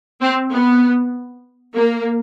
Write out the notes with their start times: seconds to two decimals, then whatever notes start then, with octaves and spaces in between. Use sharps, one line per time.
0.22 C4
0.53 B3
1.76 A#3